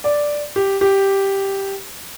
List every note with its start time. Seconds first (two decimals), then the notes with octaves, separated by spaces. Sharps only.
0.04 D5
0.56 G4
0.81 G4